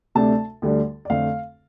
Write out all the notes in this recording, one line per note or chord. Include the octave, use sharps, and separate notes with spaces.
D2 C3 A3 D4 A5
D2 D3 G3 D4
D5
F2 D3 A3 C4 F5